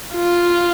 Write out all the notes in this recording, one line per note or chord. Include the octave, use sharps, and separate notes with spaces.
F4